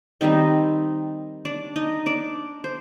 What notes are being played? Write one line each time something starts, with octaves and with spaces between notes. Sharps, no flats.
D#3 G3 C4 D#4 D#5
D4 D5
D#4 D#5
D4 D5
C5